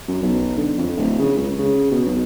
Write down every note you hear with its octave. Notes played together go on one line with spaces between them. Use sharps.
F#2
B1
D3
F2
D1
C#3
C#2
C#3
B2
B1